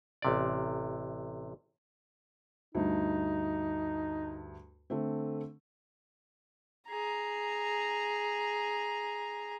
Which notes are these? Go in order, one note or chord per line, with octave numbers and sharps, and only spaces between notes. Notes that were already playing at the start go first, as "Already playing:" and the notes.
A1 C3 D5
D2 G2 D#4
D3 A3 C4
G#4 A#5